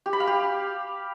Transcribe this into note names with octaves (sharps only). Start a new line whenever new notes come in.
G4
B5
F5
G4